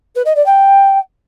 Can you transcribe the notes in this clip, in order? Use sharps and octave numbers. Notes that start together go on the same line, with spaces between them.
B4
D#5
D5
G5